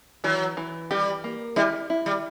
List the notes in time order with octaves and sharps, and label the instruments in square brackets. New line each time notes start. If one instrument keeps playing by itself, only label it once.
[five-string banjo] E3 [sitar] F#3
[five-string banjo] E3
[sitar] G3 [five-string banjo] G4
[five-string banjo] A#3
[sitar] G3 [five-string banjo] E4
[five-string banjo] E4
[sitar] G3